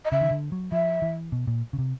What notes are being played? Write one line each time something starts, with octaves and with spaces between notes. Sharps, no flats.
D#5
C#3 E5
D#3
D3
F#3
F3 E5
E3
B2
A#2
C#3
C3